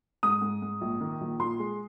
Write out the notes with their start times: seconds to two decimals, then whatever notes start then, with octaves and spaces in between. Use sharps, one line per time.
0.23 G#2 D#6
0.42 G#2
0.62 G#2
0.81 A#1
1.01 D#3
1.21 A#1
1.40 A#2 C6
1.60 G#3